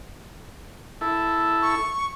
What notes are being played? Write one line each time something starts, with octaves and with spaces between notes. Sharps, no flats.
E4 A4
C#6